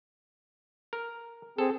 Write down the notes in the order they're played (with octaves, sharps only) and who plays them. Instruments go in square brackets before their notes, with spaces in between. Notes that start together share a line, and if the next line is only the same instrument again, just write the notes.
[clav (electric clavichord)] A#4
[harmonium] C4 G#4 [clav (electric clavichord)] A4